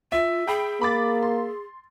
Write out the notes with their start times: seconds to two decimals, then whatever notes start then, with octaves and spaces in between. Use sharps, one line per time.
0.12 F4 E5
0.47 G#4 G5 B5
0.81 A#3 B5 D6 A6
1.22 C6